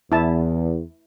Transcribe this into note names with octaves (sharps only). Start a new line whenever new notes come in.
E2 E4 A5